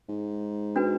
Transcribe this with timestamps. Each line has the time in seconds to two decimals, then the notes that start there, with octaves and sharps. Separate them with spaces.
0.09 G#2
0.76 D4 F#4 B4